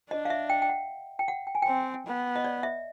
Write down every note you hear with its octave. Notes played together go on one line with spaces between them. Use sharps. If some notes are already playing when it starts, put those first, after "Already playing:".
D4 D#5
F5
E5
G5
G5
F#5
G5
F#5
G5
G#5
C4 G5
B3
D#5
D5
E5